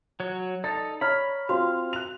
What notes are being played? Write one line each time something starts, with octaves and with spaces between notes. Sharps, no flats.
F#3 C#5
D#4 A4 D5 A6
C#5 A#5 B5 F6
C4 F4 F#4 F5 C6
F#6 F7